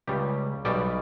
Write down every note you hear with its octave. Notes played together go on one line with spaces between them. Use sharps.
C#2 C#3 G3 G4
B1 B2 G3 D5